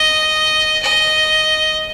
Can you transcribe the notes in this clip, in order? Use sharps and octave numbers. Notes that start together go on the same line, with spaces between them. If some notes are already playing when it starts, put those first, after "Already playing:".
Already playing: D#5
D#5